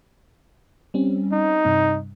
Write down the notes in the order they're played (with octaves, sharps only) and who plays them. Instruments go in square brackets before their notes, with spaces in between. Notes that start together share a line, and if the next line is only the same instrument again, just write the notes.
[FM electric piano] G3 C4 C#4
[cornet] D#4
[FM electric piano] G2 C3